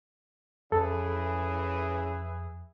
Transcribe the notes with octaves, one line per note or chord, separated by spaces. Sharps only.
F2 C#3 E3 G#4 A4 B4 E5